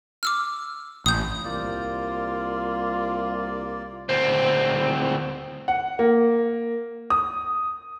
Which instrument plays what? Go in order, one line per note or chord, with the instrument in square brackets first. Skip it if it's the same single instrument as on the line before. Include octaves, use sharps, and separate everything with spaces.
[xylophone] D6 E6 F6
[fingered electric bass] A1 [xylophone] D#6 G6
[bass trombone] C2 [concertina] A#3 D5 [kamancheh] F4
[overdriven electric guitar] D2 C4
[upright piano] F#5
A#3
D#6